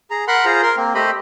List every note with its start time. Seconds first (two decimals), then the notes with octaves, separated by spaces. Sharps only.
0.11 G#4 A#5
0.28 A#4 F#5 B5 C6 F#6
0.45 F4 G#4 C5 A#5
0.62 A#4 C6
0.77 A#3 C4
0.95 A3 G4 C5 D#5 B5